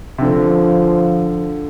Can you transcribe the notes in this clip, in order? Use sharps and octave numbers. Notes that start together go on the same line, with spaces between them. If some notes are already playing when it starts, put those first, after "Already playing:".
C3
D3 F3